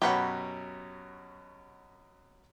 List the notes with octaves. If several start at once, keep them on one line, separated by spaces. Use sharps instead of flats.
F#2 B2 G4 B4 C#5 F#5